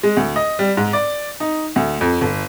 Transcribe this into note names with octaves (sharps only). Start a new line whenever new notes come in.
G#3
D2
D#5
G3
G#2
D5
D#4
D2
F2
G1